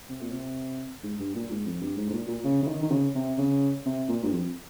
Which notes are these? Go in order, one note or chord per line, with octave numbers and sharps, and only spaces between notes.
C3
A#2
C3
G#2
G2
A#2
G#2
F2
G2
G#2
G#2
A#2
A#2
C#3
C#3
D#3
D#3
C#3
C3
C#3
C3
A#2
G2
F2